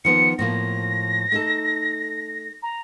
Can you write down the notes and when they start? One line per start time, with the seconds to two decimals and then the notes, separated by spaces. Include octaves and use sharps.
0.05 D#3 F3 B3 C#7
0.39 A2 F3 A#3 A#6
1.32 A3 D#4 A4
2.63 A#5